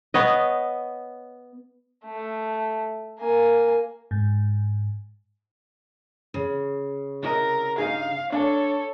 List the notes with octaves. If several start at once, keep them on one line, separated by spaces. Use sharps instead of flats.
B3 C#5 D#5
A3
A#3 G#5
G#2
C#3
C2 E4 A#4 D#5
G2 D#4 G#4 F5
D4 A4 C#5